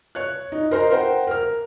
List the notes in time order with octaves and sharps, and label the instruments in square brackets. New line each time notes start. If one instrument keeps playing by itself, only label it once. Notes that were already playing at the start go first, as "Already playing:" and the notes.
[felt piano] C#5 F#6
D#4
A#4 C5 D#5 A#5
A#4 C5 F#5 G5
A#4 F6